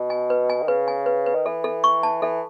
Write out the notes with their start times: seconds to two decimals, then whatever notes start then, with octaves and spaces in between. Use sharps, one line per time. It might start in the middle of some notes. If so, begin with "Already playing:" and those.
Already playing: B2
0.10 G#5
0.30 B4
0.49 G#5
0.62 D#3
0.68 C#3 B4
0.88 G#5
1.06 B4
1.26 B4
1.35 D#3
1.46 E3 A4
1.64 A4
1.84 C#6
2.03 A5
2.22 E3 A4